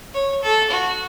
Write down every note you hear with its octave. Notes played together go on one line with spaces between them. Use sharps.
C#5
A4
F#4